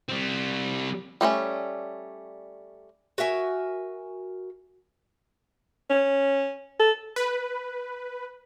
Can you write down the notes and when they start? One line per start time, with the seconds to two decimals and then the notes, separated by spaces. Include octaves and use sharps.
0.09 G3 C4
1.21 G3 A3 C4 C#4
3.18 F#4 A#4 E5 G#5
5.90 C#4
6.79 A4
7.16 B4